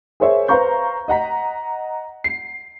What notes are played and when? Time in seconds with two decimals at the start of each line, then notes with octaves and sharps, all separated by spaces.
0.20 G#4 A#4 C5 C#5 E5
0.48 B4 C5 F5 A#5 C#6 G6
1.08 D#5 F#5 A#5 B6
2.24 C7